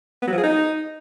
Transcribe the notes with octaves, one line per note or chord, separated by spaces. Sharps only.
B3
F#3
F3
G#4
D#4